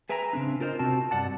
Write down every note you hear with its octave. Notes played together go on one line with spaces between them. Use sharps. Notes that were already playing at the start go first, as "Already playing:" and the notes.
G#4 B4 E5 G5 G#5 A#5
C#3 C4 D4
F4 A#4 C5 C#5 D#5
C3 C4 F#4 A5
G2 D5 F#5 A5